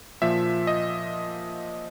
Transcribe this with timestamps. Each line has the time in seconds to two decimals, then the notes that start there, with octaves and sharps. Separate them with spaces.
0.22 A#2 F3 E5
0.67 D#5